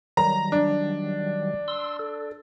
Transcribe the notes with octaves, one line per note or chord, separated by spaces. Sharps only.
D#3 F#3 G3 A#5
D4
C6 E6
A4